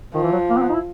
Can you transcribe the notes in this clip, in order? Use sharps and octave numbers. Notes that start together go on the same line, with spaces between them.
D#3 F3
E3
F#3
A#3
C4
B3
D#4
E4